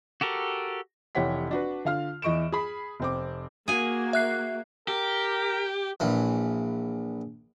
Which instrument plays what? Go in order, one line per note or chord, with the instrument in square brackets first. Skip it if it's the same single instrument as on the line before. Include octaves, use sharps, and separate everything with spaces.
[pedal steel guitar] F#4 G4 A4 A#4
[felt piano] F1 E3 G4 C#5 F#5 B6
D4 F#4 B4
D3 F4 F5 F6
E2 E3 D#5 C#6 D7 E7
G#4 B5
F1 C4 D6
[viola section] A#3 [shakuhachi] F#4 [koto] G#4 G#5
[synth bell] E5 F#6 C7
[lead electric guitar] G4 [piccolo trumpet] A#4
[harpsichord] A#1 E3